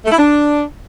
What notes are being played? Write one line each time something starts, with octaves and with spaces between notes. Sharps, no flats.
A3
E4
D4